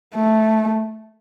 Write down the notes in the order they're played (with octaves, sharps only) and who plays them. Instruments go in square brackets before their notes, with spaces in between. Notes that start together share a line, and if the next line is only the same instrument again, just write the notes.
[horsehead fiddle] A3